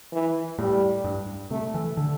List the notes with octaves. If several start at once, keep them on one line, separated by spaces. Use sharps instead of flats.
E3
A2 G3
G2
C3 A3
E3
D3